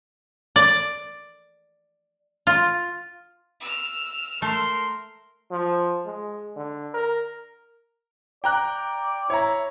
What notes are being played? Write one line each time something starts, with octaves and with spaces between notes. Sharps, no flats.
D5
F4
E6 F6
A3 A#4 C6
F3
G#3
D3
A#4
D5 G5 A#5 F#6
E4 C#5 A#5